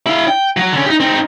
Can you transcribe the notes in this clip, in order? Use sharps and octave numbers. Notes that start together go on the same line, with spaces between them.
E4 F5
G5
F#3 F#4
D3 C#4
D#4 G4
C4 D#4